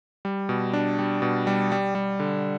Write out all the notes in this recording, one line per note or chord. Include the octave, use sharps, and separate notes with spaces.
G3
B2
D4
G3
B2
G3
G3
G3
D3